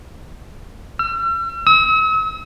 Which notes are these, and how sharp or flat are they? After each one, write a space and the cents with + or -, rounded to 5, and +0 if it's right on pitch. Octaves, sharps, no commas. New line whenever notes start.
E6 +45
E6 -45